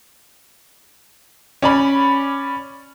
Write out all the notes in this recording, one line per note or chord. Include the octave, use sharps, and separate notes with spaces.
C#4 D5 B5